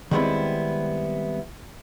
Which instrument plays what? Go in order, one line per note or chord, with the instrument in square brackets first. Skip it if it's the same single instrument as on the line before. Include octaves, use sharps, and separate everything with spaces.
[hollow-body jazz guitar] D#3 G3 G#3 B3 C4 E4